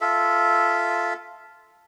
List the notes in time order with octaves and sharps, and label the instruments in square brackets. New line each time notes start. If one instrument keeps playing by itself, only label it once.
[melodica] F4 A4 E5